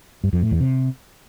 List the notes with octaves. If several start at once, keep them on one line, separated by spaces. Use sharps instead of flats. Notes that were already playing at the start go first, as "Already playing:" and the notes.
G2
F2
A2
E2
C3